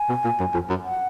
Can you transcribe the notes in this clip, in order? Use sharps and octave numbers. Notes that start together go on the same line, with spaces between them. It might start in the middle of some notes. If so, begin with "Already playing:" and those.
Already playing: G#5
B2
A#2
F#2
F2
F#2
F#5